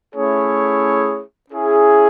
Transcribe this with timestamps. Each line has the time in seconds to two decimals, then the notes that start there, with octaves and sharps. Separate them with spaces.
0.15 A3 C#4 E4 G#4 C#5
1.50 C#4 E4 G#4